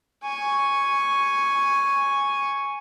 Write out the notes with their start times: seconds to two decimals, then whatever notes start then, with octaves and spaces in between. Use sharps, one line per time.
0.23 G#5 C#6